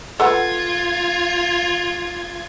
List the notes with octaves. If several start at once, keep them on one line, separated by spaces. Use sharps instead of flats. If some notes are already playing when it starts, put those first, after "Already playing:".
F4 A4 B4 F#5 G#6